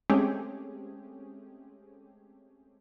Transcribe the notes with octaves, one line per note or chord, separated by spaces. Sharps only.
G#3 A3 C4 C#4 G4 G#4